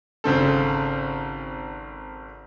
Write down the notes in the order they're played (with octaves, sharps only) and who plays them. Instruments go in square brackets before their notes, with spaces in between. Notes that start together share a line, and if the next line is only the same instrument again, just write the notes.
[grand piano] G#1 C#3 C4 A4